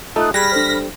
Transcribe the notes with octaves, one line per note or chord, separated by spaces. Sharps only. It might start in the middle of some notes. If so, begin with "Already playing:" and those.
A3 D#4 F4 A4 D#6 F#6
G3 G#4 B5 F6 F#6 G#6 A#6 B6
D4 A4 C5